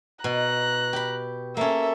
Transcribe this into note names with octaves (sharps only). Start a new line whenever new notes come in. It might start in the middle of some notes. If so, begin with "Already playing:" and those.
B2 A#5 F#6
G4 B5
A#3 C#4 A4 E5